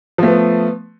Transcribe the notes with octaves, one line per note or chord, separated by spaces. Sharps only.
F3 A3 B3